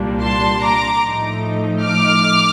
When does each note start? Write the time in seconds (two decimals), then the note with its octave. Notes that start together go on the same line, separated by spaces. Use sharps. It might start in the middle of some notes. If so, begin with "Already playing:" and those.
Already playing: C2 A#2 G3 A#3 D4
0.22 A5 C6
0.62 A#5 D6
1.03 A2 F3 A3 D#4
1.84 D6 F6